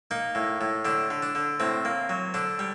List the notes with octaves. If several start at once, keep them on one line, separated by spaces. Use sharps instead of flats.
A#3 D#4
A2
A2
D3 D4
D3
D4
D3
A2 C4
A#3
F#3
D3 D4
G3